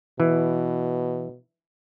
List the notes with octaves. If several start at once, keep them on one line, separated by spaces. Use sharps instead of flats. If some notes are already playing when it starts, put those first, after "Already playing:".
B2 E3